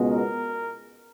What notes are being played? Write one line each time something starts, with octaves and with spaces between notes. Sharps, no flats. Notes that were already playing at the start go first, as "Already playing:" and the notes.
Already playing: C#2 B2 G#3 B3
A#4